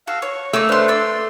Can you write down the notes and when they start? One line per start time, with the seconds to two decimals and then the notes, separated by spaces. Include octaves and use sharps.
0.07 F#4 A4 F5
0.22 C#5 C#6
0.53 A3 A#3 C#4 E6
0.69 D4 B4 C5 C6 F6
0.88 D5 C6 E6